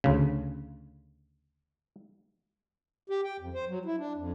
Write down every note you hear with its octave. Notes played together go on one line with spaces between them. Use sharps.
D2 C#3
G4
G5
F2
C5
F#3
E4
D4
F2